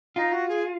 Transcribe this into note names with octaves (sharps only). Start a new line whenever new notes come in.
D#4 F4
F#4
G#4